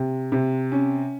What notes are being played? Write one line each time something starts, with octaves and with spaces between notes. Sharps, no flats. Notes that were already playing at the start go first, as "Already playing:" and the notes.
Already playing: C3
C3
C#4